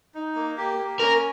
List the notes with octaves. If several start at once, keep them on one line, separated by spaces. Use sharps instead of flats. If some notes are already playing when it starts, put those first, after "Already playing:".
D#4
A#3
G4
A#3
C#4 A#4